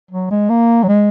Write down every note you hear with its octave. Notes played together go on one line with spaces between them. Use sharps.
F#3
G#3
A#3
F#3
G#3